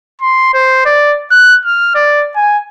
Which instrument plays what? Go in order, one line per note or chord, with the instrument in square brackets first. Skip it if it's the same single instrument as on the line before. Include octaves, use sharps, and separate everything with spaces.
[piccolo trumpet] C6
C5
D5
F#6
F6
D5
G#5